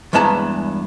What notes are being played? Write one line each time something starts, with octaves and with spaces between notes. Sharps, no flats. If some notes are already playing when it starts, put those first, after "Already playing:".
E2 G2 G#3 B3 A5 A#5